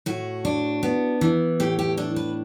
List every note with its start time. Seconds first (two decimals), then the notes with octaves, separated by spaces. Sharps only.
0.06 A2 F#4
0.45 D4
0.83 B3
1.21 E3
1.60 A2 G4
1.79 G4
1.97 D4 A4
2.16 B4